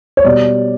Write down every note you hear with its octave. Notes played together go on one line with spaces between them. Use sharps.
C#5
B2 G3 D5